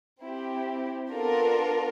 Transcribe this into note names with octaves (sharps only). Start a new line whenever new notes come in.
C4 E4 G4
B3 D4 F4 A4 A#4